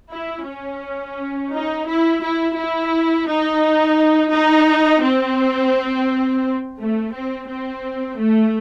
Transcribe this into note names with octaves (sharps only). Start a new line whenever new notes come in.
E4
C#4
D#4
E4
E4
E4
D#4
D#4
C4
A3
C4
C4
A3